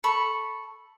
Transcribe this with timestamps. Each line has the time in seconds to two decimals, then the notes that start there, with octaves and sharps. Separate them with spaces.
0.04 A4 B5 C#6